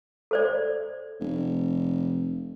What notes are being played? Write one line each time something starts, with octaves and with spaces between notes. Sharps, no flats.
A4 C5 D5
F1